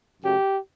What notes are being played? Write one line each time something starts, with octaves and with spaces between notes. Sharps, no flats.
F#2 C#3 F#3 A3 G4